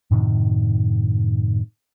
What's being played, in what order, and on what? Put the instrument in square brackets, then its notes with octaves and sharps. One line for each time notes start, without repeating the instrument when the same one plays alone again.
[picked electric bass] F#2 A2 C3 D#3